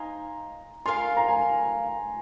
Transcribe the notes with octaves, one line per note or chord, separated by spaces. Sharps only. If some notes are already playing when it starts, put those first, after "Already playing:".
Already playing: D#4 C5 F5 G#5 A#5
F4 A#4 F5 G#5 C6
A#5
G#5